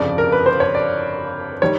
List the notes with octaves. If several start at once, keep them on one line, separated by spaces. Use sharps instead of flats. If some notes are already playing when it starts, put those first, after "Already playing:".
Already playing: G1 F2 C#3 F3 D5
A#4
B4
C5
C#5
D5
D#3 G3 C#5